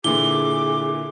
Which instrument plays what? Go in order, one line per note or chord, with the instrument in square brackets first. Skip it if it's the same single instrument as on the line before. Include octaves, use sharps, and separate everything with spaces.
[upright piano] A#2 D3 E3 [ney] G#4 [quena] D6 [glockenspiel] G7